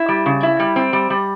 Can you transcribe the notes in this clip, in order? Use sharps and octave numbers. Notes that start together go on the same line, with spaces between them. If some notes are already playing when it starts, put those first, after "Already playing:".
Already playing: E4
G3
C#3
E4
G3
C4
G3
G3